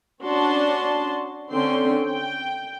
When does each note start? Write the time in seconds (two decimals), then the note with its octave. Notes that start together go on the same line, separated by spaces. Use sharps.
0.24 C#4 D4 F#4 A5 C6
1.51 D3 C4 C#4 G5 C6
2.04 G5